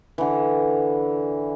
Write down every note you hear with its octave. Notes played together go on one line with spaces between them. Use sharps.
D3 E3